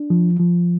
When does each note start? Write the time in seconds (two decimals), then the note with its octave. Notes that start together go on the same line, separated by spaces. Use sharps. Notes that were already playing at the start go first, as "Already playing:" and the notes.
Already playing: D4
0.10 F3
0.39 F3